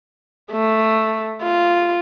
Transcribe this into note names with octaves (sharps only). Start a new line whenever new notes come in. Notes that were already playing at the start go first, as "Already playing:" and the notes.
A3
F4